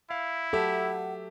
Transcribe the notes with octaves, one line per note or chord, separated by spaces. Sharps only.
E4 F5
F#3 G4 A4 E5 F#5